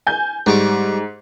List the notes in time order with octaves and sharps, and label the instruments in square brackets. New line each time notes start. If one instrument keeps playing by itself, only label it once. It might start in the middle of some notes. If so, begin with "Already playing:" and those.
[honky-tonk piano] G#5 G6
[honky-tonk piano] G#2 [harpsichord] G3 C#6 D6